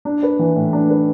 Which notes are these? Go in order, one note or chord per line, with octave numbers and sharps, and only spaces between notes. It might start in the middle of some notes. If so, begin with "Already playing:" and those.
D4
B4
E3
A2
D4
B4